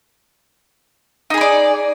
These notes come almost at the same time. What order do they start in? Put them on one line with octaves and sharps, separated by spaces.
D#4 G#4 B4 D5